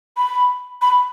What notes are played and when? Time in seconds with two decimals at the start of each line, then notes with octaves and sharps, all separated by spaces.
0.17 B5
0.82 B5